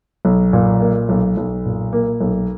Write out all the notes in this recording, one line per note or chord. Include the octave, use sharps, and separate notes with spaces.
B1
A#2
A#3
B1
B1
A#2
A#3
B1